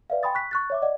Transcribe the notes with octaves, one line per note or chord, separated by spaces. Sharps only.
B4 D5 E5 F5
G5 G#5 B5 C6 D#6 A6
C#6 F#6 B6
C#6 F#6 A6
C#5 E5 D6
D5 D#5 F#5